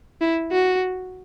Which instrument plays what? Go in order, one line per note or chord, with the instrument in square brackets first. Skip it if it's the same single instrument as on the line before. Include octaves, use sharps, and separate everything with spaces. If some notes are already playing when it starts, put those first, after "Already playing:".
[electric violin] E4
F#4